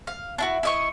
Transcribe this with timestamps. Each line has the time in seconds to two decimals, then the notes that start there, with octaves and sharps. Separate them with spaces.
0.07 F5
0.38 D4 E4 F#4
0.63 E4 D#5 C#6